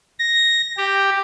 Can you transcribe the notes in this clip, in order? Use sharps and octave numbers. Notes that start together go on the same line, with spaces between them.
A#6
G4